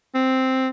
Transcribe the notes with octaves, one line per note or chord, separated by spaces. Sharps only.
C4